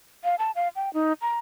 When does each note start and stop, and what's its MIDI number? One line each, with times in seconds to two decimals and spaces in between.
0.24 0.35 77
0.39 0.51 81
0.55 0.68 77
0.76 0.92 79
0.94 1.13 63
1.22 1.38 82